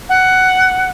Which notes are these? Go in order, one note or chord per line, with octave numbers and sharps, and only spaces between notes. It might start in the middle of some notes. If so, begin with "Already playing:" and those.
F#5